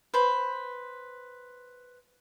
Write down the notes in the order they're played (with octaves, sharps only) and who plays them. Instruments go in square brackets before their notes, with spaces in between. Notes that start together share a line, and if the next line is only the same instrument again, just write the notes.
[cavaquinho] B4 C5